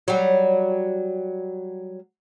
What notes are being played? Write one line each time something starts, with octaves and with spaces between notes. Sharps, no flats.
F#3 G3